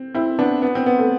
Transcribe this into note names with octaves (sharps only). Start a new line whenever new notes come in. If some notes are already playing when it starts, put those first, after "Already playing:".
Already playing: C4
C4 E4
B3 D4
B3
C4
B3
A3